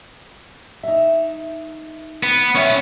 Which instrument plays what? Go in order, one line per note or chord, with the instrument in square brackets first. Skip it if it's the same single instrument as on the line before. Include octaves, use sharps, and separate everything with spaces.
[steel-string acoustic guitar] D#4 E5
[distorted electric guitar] B3
[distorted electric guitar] B3 C#4 [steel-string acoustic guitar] C#5 E5 G5